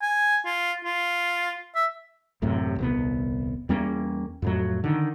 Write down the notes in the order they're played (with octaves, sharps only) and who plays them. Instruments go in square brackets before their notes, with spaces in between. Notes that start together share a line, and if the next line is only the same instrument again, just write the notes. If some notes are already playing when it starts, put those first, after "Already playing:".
[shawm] G#5
F4
F4
E5
[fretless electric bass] A1 F#2 A2 C3
D#1 C2 B3
E2 G3 A#3 C#4
F2 A2 F#3
D3 D#3